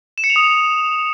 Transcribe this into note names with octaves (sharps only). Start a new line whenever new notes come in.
E7
C#7
F7
D#6